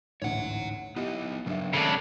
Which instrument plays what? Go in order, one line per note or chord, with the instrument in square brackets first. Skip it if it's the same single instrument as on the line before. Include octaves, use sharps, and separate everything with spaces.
[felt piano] A1 D2 G#2 [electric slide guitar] C#5 F#5
[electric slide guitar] B3 D#4 [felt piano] E4 G4 D#5
[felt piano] G2 E5 [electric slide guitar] C#3 F#3
[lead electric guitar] C#3 D4 [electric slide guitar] F#3 A4 A#4